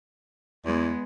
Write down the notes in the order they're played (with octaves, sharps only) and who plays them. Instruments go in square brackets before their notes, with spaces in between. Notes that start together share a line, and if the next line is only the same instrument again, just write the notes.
[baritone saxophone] E2 [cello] G#3 B3